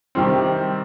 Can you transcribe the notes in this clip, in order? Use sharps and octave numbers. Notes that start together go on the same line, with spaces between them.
C3 D#3 G3 C4